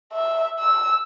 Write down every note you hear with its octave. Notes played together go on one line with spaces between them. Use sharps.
E5
E6